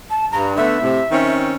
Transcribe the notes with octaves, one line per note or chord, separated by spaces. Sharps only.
A5
G2 A#5
D3 A3 B3 E5
A2 C3
D#3 C4 C#4